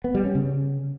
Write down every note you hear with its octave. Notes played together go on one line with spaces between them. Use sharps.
B3
G3
C#4
C#3